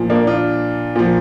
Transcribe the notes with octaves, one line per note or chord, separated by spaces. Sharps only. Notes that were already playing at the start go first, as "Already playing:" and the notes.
Already playing: A#2 F3
A#3 D4
D4 F4
A#2 F3